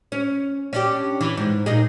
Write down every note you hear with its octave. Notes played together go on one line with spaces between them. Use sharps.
C#4
C#4 D4 G4
E3
G#2
A#2 D#4 G#4